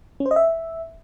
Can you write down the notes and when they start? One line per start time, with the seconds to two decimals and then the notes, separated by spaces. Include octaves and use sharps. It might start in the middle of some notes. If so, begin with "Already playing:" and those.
0.20 C#4
0.26 C5
0.31 D#5
0.36 E5